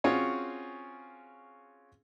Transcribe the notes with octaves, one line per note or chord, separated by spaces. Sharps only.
C4 C#4 F4 F#4 G#4 C#5